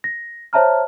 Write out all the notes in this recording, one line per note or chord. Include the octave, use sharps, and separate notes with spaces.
A#6
C5 C#5 E5 A5 A#5 F6